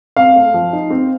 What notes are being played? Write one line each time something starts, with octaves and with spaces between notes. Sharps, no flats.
C4 F5
A3
F3
D#4
C4